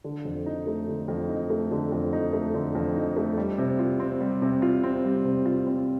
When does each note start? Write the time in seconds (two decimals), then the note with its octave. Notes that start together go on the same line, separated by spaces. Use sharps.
0.04 D3
0.25 F2
0.46 D#4
0.67 A3
0.88 D3
1.08 F2
1.29 D#4
1.50 A3
1.71 D3
1.92 F2
2.13 D#4
2.33 A3
2.54 D3
2.75 F2
2.96 D#4
3.17 A3
3.38 G3
3.58 C3
3.79 F4
4.00 C4
4.21 G3
4.42 C3
4.62 F4
4.83 C4
5.05 G3
5.25 C3
5.46 F4
5.67 C4